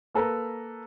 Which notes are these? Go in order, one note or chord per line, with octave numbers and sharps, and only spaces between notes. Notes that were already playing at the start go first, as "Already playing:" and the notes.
A#3 A4 B4 A#5